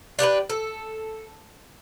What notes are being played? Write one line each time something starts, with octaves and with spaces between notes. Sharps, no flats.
D4 G4 A#4 B4
A4